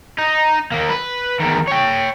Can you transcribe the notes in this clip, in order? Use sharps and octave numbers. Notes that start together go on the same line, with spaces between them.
D#4
D#3 A#3
B4
E2 D#3
C#5 G5